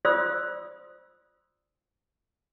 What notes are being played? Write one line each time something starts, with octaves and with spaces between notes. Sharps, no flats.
F4 C5 D5 C6 D#6 E6